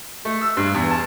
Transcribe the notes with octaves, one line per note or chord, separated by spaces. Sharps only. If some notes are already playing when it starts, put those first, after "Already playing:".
A3
E6
G2
E2
A5